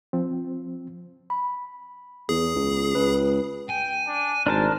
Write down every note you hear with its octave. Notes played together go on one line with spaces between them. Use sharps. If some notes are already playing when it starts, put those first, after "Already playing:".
F3 C4
B5
E2 G#4
C#2
C#2 B4
G5 G#5
D4
G#1 D4 A#4 C5 A5